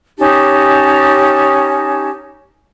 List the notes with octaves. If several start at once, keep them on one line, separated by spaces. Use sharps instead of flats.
C#4 D#4 G4 A5